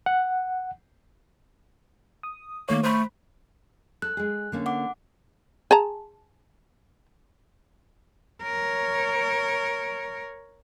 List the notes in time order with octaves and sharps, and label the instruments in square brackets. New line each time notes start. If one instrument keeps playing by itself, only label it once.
[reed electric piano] F#5
[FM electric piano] D#6
[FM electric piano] D#3 A3 C#5 [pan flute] A#3
[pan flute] A3 [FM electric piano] C5 B5
[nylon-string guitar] A4 [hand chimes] F#6
[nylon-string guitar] G#3 G#4
D3 A#3 C#4
[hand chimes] F#5 D6
[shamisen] G#4 A5 A#5
[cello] A#4 C#5